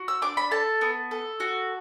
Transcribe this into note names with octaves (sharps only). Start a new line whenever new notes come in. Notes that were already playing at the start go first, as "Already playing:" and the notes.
Already playing: F#4
E6
D4 D6
B5
A4 A5
B3
A4
F#4